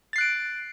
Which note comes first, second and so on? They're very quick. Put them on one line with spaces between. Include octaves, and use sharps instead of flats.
A6 C7 F#6 D7